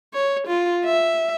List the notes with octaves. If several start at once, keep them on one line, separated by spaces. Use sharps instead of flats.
C#5
F4
E5